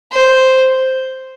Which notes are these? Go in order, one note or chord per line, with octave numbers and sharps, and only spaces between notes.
C5